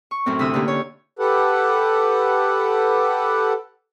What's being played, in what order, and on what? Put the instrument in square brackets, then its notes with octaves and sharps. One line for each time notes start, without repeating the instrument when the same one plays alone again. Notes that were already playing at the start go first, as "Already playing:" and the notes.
[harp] C#6
F#2 A2 C4
D2 C3 E4 B5 D#6 E6
D3 A#3 C#4 G4
C#5
[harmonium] G4 A4 B4 F#5